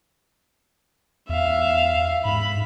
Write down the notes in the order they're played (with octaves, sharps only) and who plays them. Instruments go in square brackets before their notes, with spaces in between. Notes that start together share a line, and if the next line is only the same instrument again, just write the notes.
[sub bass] E2 [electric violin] E5 F5
[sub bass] G#2 [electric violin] B5